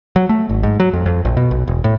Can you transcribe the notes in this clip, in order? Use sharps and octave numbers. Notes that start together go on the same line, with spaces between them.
F#3
A3
G#1
G#2
F#3
F2
F2
A#1
B2
B1
E1
A2